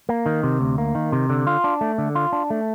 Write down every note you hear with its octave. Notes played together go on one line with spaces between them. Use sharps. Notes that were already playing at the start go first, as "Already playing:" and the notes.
A#3
D#3
C3
D2
A#3
D#3
C3
D3
F4
D4
A3
D3
F4
D4
A3